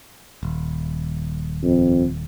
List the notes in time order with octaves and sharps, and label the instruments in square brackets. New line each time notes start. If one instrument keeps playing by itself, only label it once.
[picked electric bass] D#1
[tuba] F2